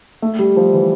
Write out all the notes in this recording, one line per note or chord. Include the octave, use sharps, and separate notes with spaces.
A3
G3
F3
E3